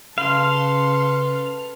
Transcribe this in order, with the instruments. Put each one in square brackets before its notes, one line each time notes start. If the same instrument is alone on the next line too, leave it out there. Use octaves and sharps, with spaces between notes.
[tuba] C#3 [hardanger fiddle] A4 B4 [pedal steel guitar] F5 [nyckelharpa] C6